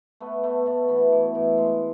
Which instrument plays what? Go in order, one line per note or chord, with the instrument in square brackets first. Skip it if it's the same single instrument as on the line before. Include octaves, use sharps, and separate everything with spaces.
[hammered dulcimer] A3 B3
A3 B3
B2 A3
E3 B3
E3
A2
G#3